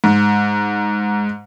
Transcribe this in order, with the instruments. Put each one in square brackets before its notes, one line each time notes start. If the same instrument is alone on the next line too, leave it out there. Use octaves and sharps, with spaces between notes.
[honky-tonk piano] G#2